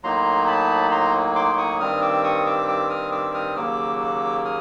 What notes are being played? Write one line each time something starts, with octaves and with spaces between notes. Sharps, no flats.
A2 F#3 A#3 D#4 A#5 C6
A5 B5
A#5 C6
C6 D6
C#6 D#6
G2 D#3 G3 C4 D#6 F6
D6 E6
C#6 D#6
D6 E6
D6 E6
D#6 F6
D6 E6
E6
D#6 F6
D#2 C#3 F#3 A#3 D6 E6
D#6 F6